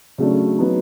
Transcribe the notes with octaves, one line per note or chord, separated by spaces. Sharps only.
C#3 F#3 A3 D4
F#3 B3 D#4